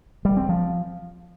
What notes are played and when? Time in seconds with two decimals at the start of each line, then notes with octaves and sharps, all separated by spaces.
0.25 G3
0.37 C4
0.49 F3